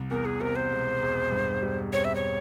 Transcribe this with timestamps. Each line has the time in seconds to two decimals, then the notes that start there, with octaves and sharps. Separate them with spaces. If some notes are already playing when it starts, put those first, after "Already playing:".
Already playing: C2
0.11 E2 A#4
0.25 G#4
0.40 C3 A#4
0.56 C5
0.72 E1
1.02 E1
1.32 G2
1.62 G3
1.93 C4 C#5
2.05 E5
2.15 C#5